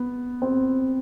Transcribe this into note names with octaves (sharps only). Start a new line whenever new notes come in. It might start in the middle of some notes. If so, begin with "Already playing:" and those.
Already playing: B3
C4